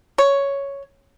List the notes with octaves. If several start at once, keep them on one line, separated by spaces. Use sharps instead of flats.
C#5